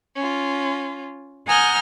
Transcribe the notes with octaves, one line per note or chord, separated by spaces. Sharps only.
C#4 F4
F#5 G#5 A#5 D#6 F6 G6